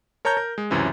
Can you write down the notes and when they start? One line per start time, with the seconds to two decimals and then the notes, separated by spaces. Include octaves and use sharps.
0.25 A#4 C#5 A5 A#5 G6
0.37 A#4
0.58 G#3
0.71 C#2 F#2 C3 E3 C#4